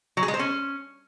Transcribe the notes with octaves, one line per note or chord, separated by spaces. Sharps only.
F#3
G#4
G#3
C5
C#4